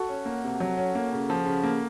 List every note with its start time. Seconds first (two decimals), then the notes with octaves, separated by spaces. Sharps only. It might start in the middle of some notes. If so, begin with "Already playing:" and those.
Already playing: F#4 A4
0.09 C#4
0.25 A#3
0.44 C3
0.60 F#3
0.77 C#4
0.95 A#3
1.12 C#3
1.30 F3
1.46 C#3
1.64 A#3